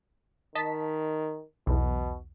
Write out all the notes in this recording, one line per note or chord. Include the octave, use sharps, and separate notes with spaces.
D#3 D#5 A5 B6
B1 E2 B2